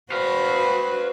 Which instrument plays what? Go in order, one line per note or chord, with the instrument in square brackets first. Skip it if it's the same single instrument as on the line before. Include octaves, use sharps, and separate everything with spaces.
[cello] F#4 C5 [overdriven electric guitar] B4 F5